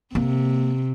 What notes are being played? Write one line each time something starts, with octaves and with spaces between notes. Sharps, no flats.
C3 A#3